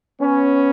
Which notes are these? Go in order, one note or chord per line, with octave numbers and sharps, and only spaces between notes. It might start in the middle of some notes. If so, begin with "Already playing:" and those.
B3 C#4